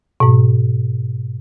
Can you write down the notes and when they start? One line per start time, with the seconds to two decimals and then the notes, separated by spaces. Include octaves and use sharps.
0.20 G#2 B2